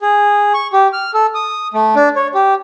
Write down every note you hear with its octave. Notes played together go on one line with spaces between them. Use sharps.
G#4
C#6
G4
F6
A4
D#6
A3
D4
C#5
G4